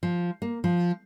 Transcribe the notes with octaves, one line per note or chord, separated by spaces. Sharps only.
F3
A#3
F3